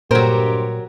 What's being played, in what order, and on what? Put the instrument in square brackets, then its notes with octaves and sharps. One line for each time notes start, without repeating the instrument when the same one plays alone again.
[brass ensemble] G2 G4 [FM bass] A#2 [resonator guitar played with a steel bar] F#3 A#4 [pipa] C5